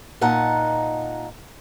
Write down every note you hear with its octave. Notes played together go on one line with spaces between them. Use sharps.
A#2 D#4 F#5 A5